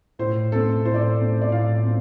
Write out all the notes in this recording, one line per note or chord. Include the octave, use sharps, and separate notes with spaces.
A2 C5
A3 C4 A4
A2 C5
D5
C5
A3 C4
D5
A2 F5
C4